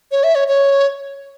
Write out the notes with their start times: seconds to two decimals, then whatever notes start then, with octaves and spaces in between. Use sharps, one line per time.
0.11 C#5
0.24 E5
0.35 C#5
0.48 C#5